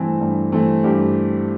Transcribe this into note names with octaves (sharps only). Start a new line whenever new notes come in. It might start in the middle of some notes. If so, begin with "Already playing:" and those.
Already playing: G2 E3 A3 C4 A4
G2
E3 A3 C4
G2 G4